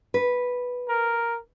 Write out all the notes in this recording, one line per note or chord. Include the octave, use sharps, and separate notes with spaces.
B4
A#4